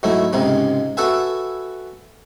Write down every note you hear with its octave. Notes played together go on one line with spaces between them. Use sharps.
G#2 F#3 A3 E4
C#2 G#2 C3 G#3
F#4 A4 B4 E5 G#5